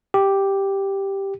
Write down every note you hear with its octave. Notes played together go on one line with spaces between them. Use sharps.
G4